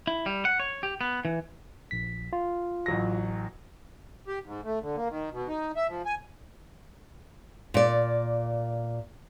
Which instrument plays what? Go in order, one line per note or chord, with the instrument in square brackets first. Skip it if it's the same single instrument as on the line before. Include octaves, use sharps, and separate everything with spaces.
[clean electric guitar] E4
G3
F#5
C#5
G4
B3
E3
[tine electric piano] A#1 B6
F4
[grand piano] A1 F#3 A#6
[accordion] G4
G#2
A3
D3
A#3
D#3
B2
D#4
E5
F3
G#5
[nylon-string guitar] A#2 D5